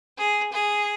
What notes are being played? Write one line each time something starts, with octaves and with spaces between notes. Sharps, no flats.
G#4
G#4